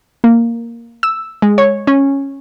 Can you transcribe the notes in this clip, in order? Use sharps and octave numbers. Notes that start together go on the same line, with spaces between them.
A#3
E6
G#3
C#5
C#4